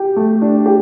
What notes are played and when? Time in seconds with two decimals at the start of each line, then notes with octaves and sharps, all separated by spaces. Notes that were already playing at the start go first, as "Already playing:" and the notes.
Already playing: G4
0.16 A3
0.42 D4
0.66 G4